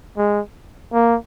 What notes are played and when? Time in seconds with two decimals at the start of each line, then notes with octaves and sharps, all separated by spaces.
0.18 G#3
0.93 A#3